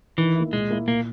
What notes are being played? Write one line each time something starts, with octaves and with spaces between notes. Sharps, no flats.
D#3 E3
A#3 E4
A#2 G#3
A#3 E4
A#2 A#3